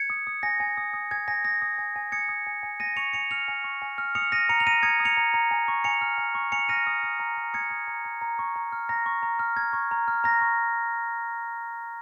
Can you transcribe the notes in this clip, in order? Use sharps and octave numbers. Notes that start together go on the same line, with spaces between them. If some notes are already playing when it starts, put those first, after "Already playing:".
Already playing: G#6 C#7
D#6
D#6
G#5 A#6
G#5
D#6
D#6
G#5 G#6
G#5 A#6
D#6 A#6
D#6
G#5
G#5
D#6 G#6 C#7
D#6
G#5
G#5
G#5 A#6 D#7
C#6 C#7 F7
G#5 C#7 F7
F6 C#7 F7
G#5
C#6
G#5
F6
D#6 C#7 F7
D#6 A#6 D#7
A#5 C#7 F7
F7
A#5 A#6 D#7
D#6 G#6 C#7
D#6
C#7 F7
A#5
A#5
G#5
C#6
G#5 C#7 F7
F6
G#5
C#6
G#5 C#7 F7
F6 A#6 D#7
D#6
D#6
A#5
A#5
D#6 G#6 C#7
D#6
A#5
A#5
A#5
C#6
A#5
F6
A#5 A#6
C#6
A#5
F6
A#5 G#6
C#6
A#5
F6
A#5 A#6
C#6